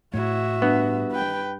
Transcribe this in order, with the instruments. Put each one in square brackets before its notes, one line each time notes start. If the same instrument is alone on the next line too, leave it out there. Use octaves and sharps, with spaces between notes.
[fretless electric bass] A2 A3 [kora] E4 C#5 [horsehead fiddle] F#4 E5
[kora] G2 [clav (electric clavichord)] B3
[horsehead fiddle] B4 G5